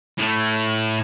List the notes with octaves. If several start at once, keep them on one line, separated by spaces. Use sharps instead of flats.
A2 A3